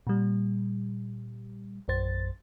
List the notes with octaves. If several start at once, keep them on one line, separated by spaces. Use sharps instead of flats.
A#2 G3
A#1 F#2 C5 A6